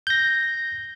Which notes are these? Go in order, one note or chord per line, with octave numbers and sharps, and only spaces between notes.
G6 A#6